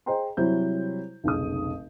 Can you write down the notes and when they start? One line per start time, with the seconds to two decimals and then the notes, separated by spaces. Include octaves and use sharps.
0.06 G#4 C5 D#5 G5 A#5 C6
0.37 C3 F#3 G3 E4 C5 G6
1.24 F1 B1 C#3 G#4 D#6